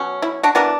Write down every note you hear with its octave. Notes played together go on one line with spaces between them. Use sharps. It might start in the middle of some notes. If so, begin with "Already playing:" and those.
Already playing: B2 F#3 C#4
E4
D4 F#4
E3 B3 D4 F#4 A#4